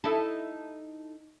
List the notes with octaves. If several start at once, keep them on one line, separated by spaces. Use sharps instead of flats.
D#4 E4 A4